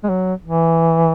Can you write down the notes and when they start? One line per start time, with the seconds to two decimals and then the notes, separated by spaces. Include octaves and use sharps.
0.04 G#3
0.09 F#3
0.45 E3